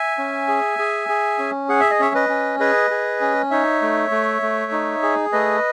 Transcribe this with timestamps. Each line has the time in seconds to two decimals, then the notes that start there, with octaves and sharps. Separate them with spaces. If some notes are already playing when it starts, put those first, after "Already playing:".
Already playing: E5 G#5
0.18 C#4
0.48 G#4
0.79 G#4
1.09 G#4
1.38 C#4
1.69 G#4 F#5
1.80 E5
1.91 D#5
1.99 C#4 C#5 E5
2.15 B4 D#5
2.29 C#4
2.60 G#4 B4 D#5
2.91 G#4
3.21 C#4
3.51 D#4 C#5 E5
3.82 A3
4.11 A3
4.42 A3
4.72 D#4
5.03 G#4
5.32 A3 B4 D#5